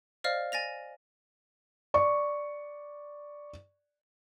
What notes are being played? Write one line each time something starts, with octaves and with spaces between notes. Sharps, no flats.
C5 D5 D#5 F5 F6
G#5 A6 A#6 F7
D5 C#6